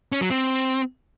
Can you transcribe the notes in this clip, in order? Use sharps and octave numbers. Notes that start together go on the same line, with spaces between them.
C#4
F#3
C4